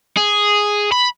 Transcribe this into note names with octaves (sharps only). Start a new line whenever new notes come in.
G#4
B5